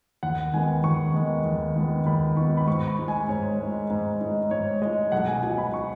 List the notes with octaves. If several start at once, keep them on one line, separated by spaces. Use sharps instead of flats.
D#2 F#5
D#3 G#3 B3 G#5
D#2 C#6
D#3 G#3 B3
D#2
D#3 G#3 B3
D#2 B5
D#3 G#3 B3 C#6
B5
G#2 C#6
B5
G#3 D#4
G#5
G#2 C#5
G#3 D#4
G#2
G#3 D#4
G#2 C#5
G#3 D#4 D#5
B1 F#5
G#5
B2 G#3 D#4 G#5
B5
C#6